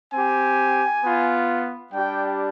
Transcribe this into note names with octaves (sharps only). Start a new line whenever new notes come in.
C4 G4 G#5
B3 F4
G3 D4 G4 G5